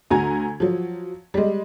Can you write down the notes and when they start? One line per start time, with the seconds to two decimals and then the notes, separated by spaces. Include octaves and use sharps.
0.11 D2 F#4 G#5 A#5 G#6
0.60 F3 F#3
1.34 G3 G#3